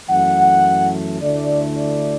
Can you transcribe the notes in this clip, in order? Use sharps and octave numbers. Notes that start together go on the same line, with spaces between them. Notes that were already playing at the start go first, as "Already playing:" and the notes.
F#2 E3 A3 F#5
D2 D3 A3 E4 D5
D5